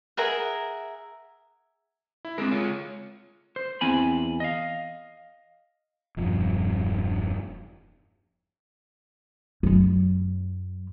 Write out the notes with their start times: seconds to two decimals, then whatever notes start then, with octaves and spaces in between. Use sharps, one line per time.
0.17 G#4 A#4 E5 F#5
2.25 E4
2.38 G#3 C4 A4 A#4
2.51 F4 C#5
3.56 C5
3.81 E2 C4 G#5 B5
4.40 D#5 F5
6.17 E1 G2 F3
9.63 F#2 F#3